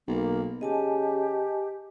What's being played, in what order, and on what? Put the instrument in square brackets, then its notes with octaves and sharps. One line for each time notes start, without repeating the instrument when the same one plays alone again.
[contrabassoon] B1 [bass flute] A#3
[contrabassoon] C#3 [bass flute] G4 [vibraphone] D#5 G#5 A5